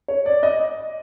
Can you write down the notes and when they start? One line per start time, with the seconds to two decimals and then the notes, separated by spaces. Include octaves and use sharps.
0.08 C#5
0.26 D5
0.43 D#5